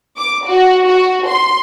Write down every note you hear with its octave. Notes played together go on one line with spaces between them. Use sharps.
D6
F#4
F#4
C6